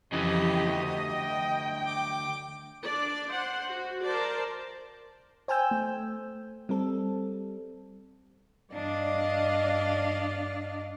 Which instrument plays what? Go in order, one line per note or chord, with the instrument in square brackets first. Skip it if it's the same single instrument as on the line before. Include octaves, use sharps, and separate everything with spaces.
[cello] F2 G4 [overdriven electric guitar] C#3 E3 [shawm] D#5
[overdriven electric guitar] D2
[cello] G5
[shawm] D6
[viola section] D4 D5
C5 F#5
F#4
A#4 C5 D5 A5
[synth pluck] C5 G5 G#5 E6 G6
A3
G3 C4 A4
[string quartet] G2 D4 D5 D#5 F5